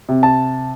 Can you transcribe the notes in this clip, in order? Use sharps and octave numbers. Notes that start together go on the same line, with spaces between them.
C3
A5